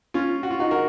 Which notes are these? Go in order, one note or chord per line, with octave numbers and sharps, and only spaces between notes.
C#4 F4
F#4
F4
D#4 F#4
F#4 A#4